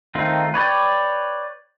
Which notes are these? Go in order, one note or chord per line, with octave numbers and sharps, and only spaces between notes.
D#3 A3 C4 D#4 F4
B4 C#5 D5 G5